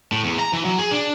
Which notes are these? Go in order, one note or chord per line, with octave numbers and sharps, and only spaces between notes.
A2
E2
A#5
E3
F#3
G#4
D4